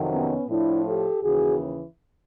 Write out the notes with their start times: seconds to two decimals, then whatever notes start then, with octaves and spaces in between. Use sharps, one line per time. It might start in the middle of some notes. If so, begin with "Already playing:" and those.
Already playing: F2 C3 D#3 F#3
0.11 B3 C#4
0.49 A2 F3 D4 E4
0.87 G4 A4
1.23 D#2 C#3 E3 F#4 G#4